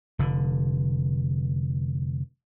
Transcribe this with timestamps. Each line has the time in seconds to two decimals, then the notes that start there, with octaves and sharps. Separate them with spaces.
0.19 F1 D3